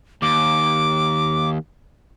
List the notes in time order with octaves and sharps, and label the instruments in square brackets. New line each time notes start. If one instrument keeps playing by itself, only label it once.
[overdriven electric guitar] D#2 [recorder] D6